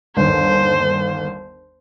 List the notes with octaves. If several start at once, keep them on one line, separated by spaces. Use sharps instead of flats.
G1 D#2 C5